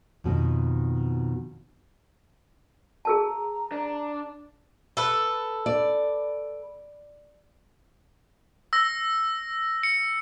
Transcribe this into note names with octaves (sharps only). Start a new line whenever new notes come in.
F2 B2 D#3
G#4 A#4 A5 A#5
D4
A4 B4
D5
E6 A#6
C#7